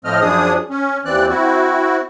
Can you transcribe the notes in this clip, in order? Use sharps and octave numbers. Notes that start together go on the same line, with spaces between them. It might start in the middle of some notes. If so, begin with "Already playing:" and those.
A2 F3 A3 C4 D#5 F6
F#2 F3 D4 G#4 D#6
C#4
D#2 E3 C4 D5 F#6
C4 E4 F#4